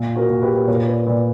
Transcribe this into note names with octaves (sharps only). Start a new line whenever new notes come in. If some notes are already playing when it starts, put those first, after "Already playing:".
Already playing: A#2
F#4 A#4
A#2
G4 B4
A#2 A#4 C#5
B4 D5
A#2 B4 D5